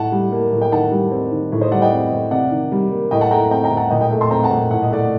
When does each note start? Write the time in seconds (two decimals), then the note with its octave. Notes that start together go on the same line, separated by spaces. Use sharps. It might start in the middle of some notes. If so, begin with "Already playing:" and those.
Already playing: A2 F#5 A5
0.12 G3
0.32 A#3
0.52 A2
0.61 G5
0.72 D#3 F#5 A5
0.92 G3
1.11 C4
1.31 D#3
1.52 A2
1.61 C5 D#5
1.71 G3 D5 F#5
1.82 D#5 G5
1.92 C4
2.12 A2
2.31 C3 D5 F#5
2.51 D#3
2.72 G3
2.92 A#3
3.11 A2 D#5 G5
3.21 F#5 A5
3.31 A3 G5 A#5
3.50 C4 G5 A#5
3.64 G5 A#5
3.70 A2
3.77 F#5 A5
3.91 A#2 D#5 G5
4.01 D#5 G5
4.11 A3
4.21 A5 C6
4.31 C4 G5 A#5
4.43 F#5 A5
4.50 A#2
4.70 A2 F#5
4.82 D#5
4.91 A3 D5 F#5